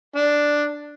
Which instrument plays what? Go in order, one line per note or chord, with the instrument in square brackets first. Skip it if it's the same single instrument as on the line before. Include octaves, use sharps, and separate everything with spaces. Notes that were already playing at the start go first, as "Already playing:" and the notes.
[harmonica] D4